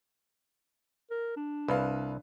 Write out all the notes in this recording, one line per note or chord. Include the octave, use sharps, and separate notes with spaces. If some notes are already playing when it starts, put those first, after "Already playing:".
A#4
D4
C2 B4 F5